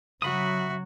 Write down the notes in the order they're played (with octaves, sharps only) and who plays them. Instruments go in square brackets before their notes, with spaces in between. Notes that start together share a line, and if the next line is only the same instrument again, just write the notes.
[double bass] C#3 F#3 [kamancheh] F#4 [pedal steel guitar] E5 B5 D#6